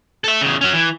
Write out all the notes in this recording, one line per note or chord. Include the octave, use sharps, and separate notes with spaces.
A4 E5
E2 C#3
F#3 C#4
E3